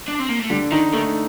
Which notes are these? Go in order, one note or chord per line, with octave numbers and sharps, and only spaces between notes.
D4
C4
A#3
A3
D3 G3
D#3 D#4
D#3 A3